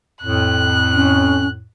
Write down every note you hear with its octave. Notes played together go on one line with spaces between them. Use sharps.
F2 A2 F#6
C#4